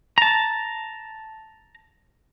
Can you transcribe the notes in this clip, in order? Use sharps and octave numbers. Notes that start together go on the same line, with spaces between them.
A5 A#5